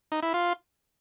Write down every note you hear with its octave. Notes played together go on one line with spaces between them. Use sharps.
D#4
E4
F4